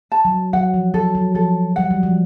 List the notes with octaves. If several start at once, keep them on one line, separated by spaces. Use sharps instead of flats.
A5
F#3
F#3 F#5
F3
F#3 A4
F#3
F3 A4
G3 F#5
F#3
F3